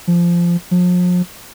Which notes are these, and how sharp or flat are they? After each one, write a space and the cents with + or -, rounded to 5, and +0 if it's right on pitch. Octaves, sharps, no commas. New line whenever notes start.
F3 -15
F3 +40